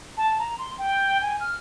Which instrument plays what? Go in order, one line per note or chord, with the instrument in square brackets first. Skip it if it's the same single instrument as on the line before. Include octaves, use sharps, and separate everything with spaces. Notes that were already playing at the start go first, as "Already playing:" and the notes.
[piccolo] A5
A#5
C6
G5
G#5
F6